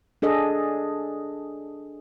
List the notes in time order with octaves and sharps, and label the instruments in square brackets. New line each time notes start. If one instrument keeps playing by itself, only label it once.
[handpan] D4 G#4 A4 D#5